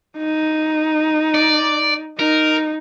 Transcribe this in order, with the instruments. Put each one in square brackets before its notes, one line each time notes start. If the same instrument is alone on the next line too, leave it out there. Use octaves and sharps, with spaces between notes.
[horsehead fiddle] D#4
[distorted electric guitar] D5
[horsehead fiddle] D#4 [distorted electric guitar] A#4